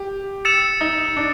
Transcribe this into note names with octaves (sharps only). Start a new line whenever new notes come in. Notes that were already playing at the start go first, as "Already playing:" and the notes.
Already playing: G4
E6 A6 C#7 E7
D#4
D4